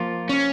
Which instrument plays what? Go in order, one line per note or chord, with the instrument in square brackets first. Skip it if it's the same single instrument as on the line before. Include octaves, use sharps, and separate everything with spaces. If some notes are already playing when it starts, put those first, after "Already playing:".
Already playing: [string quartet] F3 A#3 F4
[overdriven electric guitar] C#4